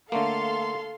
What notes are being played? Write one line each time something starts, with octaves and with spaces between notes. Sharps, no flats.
D3 A3 A#3 A4 F5 C6